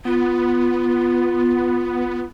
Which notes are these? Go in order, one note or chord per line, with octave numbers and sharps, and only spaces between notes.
B3 F4